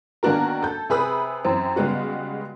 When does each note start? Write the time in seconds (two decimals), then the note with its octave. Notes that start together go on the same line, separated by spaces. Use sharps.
0.23 D#3 A#3 B3 D4 F#4 A#4
0.62 A4 G6
0.89 C3 G#4 B4 B5 D#6
1.45 F#2 E3 C4
1.76 C#3 G3 G#3 B3 F#4